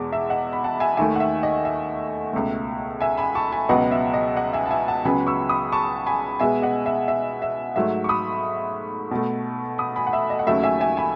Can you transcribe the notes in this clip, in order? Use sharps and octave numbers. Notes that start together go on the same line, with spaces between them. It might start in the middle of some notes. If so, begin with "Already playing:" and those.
Already playing: E2 B2 G#3
E5
D#5 F#5
B5
F#5 A5
E5 G#5
D#2 D#3 A3 E5 G#5
F#5
E5
D#5
E5
C#2 B2 A3
E5 G#5
G#5 B5
A5 C#6
G#5 B5
C#2 B2 F#3 B3 D#5 F#5
E5
D#5
D#5 F#5
E5 G#5
A5
E5 G#5
F#5 A5
C#2 C#3 F#3 B3 G#5 B5
C#6 E6
B5 D#6
A5 C#6
G#5 B5
B2 G#3 B3 E5 G#5
D#5 F#5
E5
E5
E5
G#2 F#3 A3 E5
C#6
B5 D#6
B2 A3
B5 D#6
G#5 B5
F#5
E5
D#5
F#5
D#2 C#3 F#3 A3 E5
E5 G#5
E5 G#5
G#5 B5